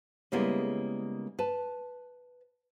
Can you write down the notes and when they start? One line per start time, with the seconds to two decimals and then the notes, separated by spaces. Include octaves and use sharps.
0.32 C#3 G3 G#3 A#3 B3 E4
1.39 B4 A5